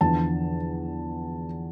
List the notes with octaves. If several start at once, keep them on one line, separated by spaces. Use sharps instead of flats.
E2 D3 F3 A5